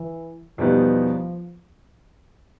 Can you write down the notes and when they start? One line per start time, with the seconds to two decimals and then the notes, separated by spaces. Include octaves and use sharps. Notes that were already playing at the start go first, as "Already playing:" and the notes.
Already playing: E3
0.58 E2 B2 F3 G3 B3 D#4